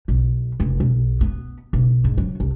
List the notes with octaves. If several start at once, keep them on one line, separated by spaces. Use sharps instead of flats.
B1
F1
B1
B3
B1
G#2
F#3
C2